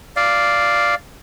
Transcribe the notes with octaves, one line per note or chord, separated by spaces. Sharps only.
D5 F5